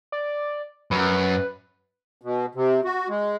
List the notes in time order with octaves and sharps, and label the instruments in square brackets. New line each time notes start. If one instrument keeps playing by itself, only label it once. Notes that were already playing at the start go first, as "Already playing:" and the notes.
[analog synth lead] D5
[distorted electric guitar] F#2 [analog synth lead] B4
[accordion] B2
C3
F#4
G#3